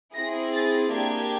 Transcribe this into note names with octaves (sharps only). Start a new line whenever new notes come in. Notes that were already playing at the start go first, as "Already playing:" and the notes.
C4 E4 G#4 A#6
A6
A#3 D4 G4 G#6